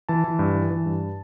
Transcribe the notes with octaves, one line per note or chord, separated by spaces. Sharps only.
E3 A5
E3
G2
E3
E3
G2